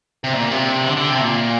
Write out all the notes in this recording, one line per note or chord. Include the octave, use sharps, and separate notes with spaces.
C3
A#2
C3
D3
D3
C3
A#2